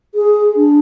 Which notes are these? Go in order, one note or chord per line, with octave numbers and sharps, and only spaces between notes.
G#4
D4